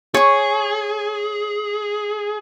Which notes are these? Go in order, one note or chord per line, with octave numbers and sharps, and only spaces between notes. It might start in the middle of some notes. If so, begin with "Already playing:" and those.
G#4 C#5 C#6